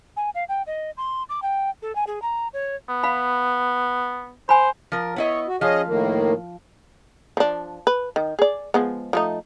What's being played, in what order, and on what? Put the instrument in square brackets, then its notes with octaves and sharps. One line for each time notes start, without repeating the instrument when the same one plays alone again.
[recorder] G#5
F5
G5
D#5
C6
D6
G5
A4
G#5
G#4
A#5
C#5
[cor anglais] B3
[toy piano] F5 B5
[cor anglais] C5 [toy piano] G#5 B5
[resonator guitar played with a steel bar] F3 A#4
[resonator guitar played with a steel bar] B3 E4 D#5 [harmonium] C#5
[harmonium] F#4
[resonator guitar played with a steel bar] F3 F5 [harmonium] C#4 G#4 D#5
[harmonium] A2 D#3 A#3
[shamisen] F3 D4
B4
D#3
G#4 D5
F3 G#3 B3
F3 A3 D#4